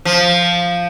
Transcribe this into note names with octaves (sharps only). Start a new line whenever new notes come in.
F3